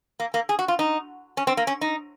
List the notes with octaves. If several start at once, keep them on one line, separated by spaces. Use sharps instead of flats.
A#3
A#3
G#4
F#4
F4
D#4
C#4
C4
A#3
C#4
D#4